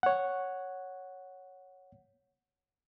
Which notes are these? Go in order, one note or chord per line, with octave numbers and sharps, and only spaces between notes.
C#5 F#5